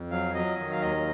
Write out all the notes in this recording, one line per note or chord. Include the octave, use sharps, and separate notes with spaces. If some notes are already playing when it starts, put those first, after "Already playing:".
Already playing: F2
F#3 F5
F#3 D#5
D#3
F5
D#2 D#5